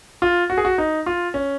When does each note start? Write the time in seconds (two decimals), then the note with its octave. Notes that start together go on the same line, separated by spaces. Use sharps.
0.22 F4
0.50 F#4
0.57 G#4
0.65 F#4
0.78 D#4
1.06 F4
1.34 C#4